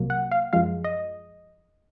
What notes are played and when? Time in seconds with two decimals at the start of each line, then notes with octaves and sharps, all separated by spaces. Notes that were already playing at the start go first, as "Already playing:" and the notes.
Already playing: C2 C3 F#3 A#3
0.10 F#5
0.31 F5
0.53 F#2 F3 G#3 F5
0.84 D#5